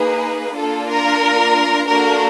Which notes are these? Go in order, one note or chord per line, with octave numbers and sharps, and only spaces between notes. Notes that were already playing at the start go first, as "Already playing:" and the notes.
Already playing: A#3 D#4 G#4 B4
A#3 D4 F4 A4
A#4
A#3 D4 F#4 A4 A#4